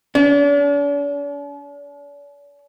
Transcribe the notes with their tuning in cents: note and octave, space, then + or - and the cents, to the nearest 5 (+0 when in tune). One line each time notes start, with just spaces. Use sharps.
D4 -45